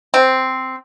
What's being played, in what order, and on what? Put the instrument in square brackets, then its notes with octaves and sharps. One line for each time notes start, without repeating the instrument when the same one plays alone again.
[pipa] C4